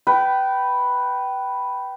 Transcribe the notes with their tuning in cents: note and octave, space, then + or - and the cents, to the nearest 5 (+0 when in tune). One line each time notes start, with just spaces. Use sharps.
B4 +0 G5 -20